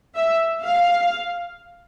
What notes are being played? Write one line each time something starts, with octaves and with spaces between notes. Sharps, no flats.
E5
F5